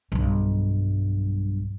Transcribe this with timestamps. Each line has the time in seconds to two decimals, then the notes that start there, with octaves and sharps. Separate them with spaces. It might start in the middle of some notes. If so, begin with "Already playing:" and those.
0.12 B1 G2